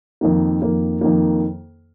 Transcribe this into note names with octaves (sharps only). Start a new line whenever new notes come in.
F2 D#3 A#3
F2 D#3 A#3
F2 D#3 A#3